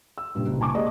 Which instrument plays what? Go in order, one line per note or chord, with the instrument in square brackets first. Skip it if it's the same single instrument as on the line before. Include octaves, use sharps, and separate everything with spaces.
[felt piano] E6
G2 A#2 C#3 G3
F#1 C2
G#5 A5 C#6 D6
G#3 A#3 G4 G#4 D5 D#5